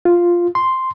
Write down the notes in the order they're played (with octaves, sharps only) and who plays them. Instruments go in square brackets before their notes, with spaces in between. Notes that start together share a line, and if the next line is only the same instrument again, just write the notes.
[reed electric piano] F4
C6